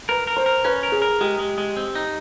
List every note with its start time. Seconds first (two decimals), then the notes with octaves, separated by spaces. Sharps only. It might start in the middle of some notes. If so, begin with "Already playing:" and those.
0.09 A#4 B4
0.27 A#4
0.37 C5
0.46 A#4
0.65 C#4 B4
0.83 A#4
0.92 G#4
1.02 A#4
1.21 G#3 G4
1.39 G#3
1.58 G#3
1.77 C4
1.95 D#4